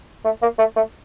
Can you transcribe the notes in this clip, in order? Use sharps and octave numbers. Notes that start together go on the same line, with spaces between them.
A3
A#3
A3
A3